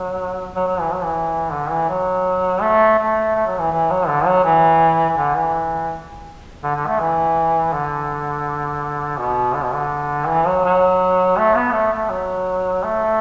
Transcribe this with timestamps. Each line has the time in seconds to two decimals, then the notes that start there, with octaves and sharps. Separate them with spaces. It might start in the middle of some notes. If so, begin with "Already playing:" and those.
Already playing: F#3
0.55 F#3
0.68 F#3
0.80 E3
0.92 F#3
1.03 E3
1.52 D3
1.71 E3
1.89 F#3
2.62 A3
2.99 A3
3.35 A3
3.47 F#3
3.59 E3
3.72 E3
3.90 F#3
4.08 D3
4.26 F#3
4.44 E3
5.10 E3
5.17 D3
5.36 E3
6.64 D3
6.75 D3
6.87 A3
7.00 E3
7.73 D3
9.18 B2
9.55 D3
9.64 B2
9.74 D3
10.28 E3
10.46 F#3
10.64 F#3
11.38 A3
11.56 B3
11.73 A3
11.92 A3
12.10 F#3
12.84 A3